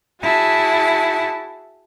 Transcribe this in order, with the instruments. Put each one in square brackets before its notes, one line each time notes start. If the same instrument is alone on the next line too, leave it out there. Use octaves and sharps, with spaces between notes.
[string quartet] E4 F#4 G#4 A5